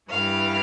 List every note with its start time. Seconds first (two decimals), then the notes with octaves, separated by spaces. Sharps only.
0.10 G2 E3 G3 F5